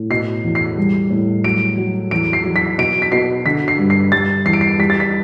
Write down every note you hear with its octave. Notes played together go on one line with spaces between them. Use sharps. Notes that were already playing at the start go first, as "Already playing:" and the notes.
Already playing: A2
B2 C7
E2
C7
G3
A2
F#3 D7
F#3
E2 D7
C7
F#3
B6
B2 D7
B6
B2 C7
D3 B6
C7
G2
C7
G3 A6
E2 C7
D7
C7
G3 B6
A6
B6